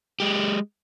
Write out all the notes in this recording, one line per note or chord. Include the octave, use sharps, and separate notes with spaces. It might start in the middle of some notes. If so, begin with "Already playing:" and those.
G#3 G4